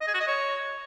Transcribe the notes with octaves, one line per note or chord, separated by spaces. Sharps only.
D#5
G#4
F#4
D#5
C#5